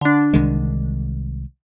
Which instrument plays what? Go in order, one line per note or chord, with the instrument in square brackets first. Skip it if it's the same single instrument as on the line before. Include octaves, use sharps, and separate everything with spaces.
[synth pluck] D3 D4
[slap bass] C2 D#3 G#3